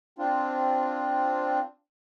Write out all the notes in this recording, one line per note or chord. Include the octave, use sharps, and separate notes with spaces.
C4 D4 F4